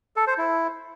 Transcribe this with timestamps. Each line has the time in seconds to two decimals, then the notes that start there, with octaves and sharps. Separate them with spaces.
0.16 A4
0.27 C5
0.38 E4